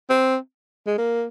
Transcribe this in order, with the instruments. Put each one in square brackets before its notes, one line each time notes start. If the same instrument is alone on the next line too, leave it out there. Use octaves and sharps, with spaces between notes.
[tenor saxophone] C4
G#3
A#3